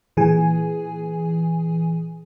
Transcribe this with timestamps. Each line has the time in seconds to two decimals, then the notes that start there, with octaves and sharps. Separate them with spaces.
0.17 A#2 E3 G#4 G#5